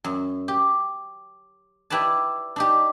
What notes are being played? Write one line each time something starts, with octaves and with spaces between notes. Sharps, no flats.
F#2
G4
E4 G4 B4 D5 A5
D4 D#4 G4